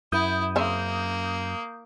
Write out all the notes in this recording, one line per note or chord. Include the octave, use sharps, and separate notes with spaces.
F#2 E4 D#6 G6
C#3 A#3 C4 E5